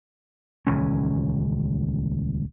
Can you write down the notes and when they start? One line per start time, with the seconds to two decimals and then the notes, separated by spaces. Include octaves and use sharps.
0.67 D#1 C#2 E3 C#4